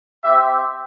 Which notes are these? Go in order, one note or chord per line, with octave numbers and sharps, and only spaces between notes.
C4 G4 E5